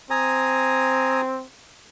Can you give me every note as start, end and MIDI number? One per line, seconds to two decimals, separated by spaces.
0.10 1.44 60
0.10 1.21 80
0.10 1.21 82
0.10 1.21 87